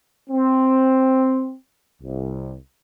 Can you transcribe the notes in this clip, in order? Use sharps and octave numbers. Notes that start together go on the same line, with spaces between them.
C4
C2